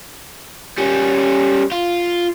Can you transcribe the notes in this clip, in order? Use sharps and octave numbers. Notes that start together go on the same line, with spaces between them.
G3 C#4
F4